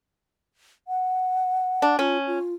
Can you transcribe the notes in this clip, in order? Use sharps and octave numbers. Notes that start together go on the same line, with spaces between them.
F#5
D4
C#4 F4
F4